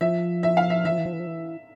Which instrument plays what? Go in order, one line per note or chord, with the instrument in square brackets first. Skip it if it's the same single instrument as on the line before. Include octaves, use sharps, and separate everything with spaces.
[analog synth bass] F3 [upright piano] E5
[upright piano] E5
F5
E5
[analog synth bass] E3 [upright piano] E5
[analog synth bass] F3
E3
F3
E3
F3
E3